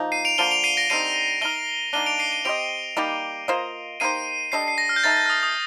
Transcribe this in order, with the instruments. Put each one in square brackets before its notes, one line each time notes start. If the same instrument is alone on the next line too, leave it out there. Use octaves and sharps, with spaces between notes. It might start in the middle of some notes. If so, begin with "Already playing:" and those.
Already playing: [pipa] F3 A#3 D#4
[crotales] C7 D#7
D7 F7
[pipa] D3 F3 A#3 [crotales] D#7 G7
[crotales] D7 F7
C7 D#7
A#6 D7
[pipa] D3 G3 C4 D#4 [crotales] C7 D#7
[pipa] A3 D#4 A#4 [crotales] D#7 G7
[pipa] D#3 A#3 D4 [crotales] D#7 G7
[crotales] D7 F7
C7 D#7
C7 D#7
[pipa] C4 G4 C5 D#5 [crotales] D7 F7
[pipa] G3 A#3 D#4 G4
A#3 F4 C5 D#5
[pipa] A#3 D#4 G4 C5 [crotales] C7 D#7
[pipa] G3 D4 A4 D#5 [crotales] C7
[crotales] C7
A#6
F6
G6
[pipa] A3 D#4 A4 [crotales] A6
[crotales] G6
F6
D#6
D#6